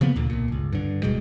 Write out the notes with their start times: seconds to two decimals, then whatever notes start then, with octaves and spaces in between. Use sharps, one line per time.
0.01 C#3 F3 A#3 B3
0.16 D2 A#2 D3
0.30 B1 A#2
0.48 G1 C#2
0.73 G2 D3
1.03 D1 B2 G3 G#3